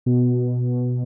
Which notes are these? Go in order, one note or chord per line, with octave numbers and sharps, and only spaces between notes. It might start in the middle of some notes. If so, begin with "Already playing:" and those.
B2